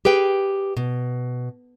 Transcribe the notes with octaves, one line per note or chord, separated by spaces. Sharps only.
G4 G#4 B4 G5
B2